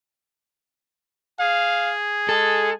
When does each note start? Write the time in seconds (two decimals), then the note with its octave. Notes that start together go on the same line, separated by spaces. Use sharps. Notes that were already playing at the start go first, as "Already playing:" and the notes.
1.40 G#4 F5
2.29 G#3 A4